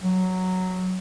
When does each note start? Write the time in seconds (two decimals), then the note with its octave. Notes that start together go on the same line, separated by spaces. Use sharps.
0.03 F#3